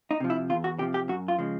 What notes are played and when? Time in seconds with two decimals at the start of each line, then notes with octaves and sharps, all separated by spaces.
0.11 D#4
0.20 C3 F3
0.30 E4
0.50 E2 F4
0.64 F#4
0.79 C3 G4
0.82 F3
0.94 G4
1.08 F#2 F#4
1.28 F4
1.39 C#3 F3 G#3